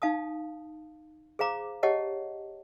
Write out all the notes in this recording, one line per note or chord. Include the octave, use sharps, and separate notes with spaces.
D#4 F5 A5 D#6
G#4 C5 F5 A#5 D6
G4 C#5 D#5 F#5 A5